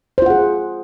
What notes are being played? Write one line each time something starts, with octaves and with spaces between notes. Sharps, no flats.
F4 G#4 C5 F#5